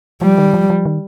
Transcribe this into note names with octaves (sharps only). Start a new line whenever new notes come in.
F3 G3
D#3
F3
F3
D#3